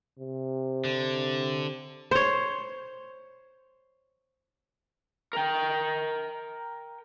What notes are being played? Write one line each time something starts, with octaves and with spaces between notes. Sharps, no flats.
C3
D3
C5 C#5
A#4 G5